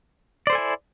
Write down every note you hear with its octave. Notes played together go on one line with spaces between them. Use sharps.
E4 A4 C5 D5 G#5